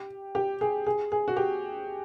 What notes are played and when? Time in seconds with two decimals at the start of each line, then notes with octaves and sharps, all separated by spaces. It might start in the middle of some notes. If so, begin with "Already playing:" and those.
Already playing: G4
0.35 G4
0.61 G#4
0.87 G#4
1.12 G#4
1.28 F#4
1.37 G4